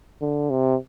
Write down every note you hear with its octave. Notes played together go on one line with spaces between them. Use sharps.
D3
C3